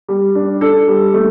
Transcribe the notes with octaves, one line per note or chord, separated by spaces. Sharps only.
G3
D4
D4 A4
G3
A3